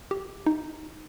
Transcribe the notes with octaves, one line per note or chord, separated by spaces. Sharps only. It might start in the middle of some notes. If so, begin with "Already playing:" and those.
G4
D#4